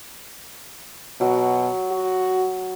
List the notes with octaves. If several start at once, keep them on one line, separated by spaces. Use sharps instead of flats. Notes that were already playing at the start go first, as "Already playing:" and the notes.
B2 F#3
F#4